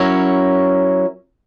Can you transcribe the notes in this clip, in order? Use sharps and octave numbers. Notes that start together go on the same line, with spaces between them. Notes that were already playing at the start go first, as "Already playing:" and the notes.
Already playing: F#3 C#4 E4 A#4 C#5